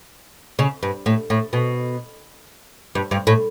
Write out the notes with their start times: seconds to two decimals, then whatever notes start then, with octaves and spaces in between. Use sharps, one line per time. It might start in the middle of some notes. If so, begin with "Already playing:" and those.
0.59 C#3
0.83 G2
1.06 A2
1.30 A2
1.53 B2
2.95 G2
3.11 G2
3.27 A2